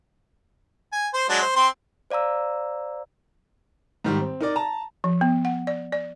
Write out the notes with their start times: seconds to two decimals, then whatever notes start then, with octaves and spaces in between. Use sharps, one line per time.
0.92 G#5
1.14 C5
1.29 F#3 G#3 D4
1.42 C5
1.56 C4 C6
2.10 C5 D5 F5 A#5 E6
4.04 G#2 D#3 G3
4.21 C4
4.41 D#4 A#4 D5
4.56 A5 A#5
5.04 F3
5.21 B3
5.45 F#5
5.67 D5
5.92 D5